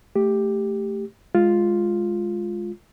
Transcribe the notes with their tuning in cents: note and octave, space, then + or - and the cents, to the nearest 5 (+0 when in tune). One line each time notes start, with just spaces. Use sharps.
A3 +0 G4 +5
G#3 +0 F4 +0